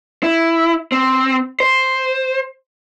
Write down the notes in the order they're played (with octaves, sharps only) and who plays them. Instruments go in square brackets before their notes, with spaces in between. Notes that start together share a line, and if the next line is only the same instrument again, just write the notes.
[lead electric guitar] E4
C4
C5